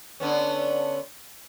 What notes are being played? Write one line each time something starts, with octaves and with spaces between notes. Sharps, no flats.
D3 B3 C#4